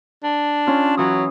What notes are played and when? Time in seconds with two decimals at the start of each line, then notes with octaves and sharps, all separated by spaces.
0.24 D4
0.67 C#4 F4
0.97 E3 F#3 D#6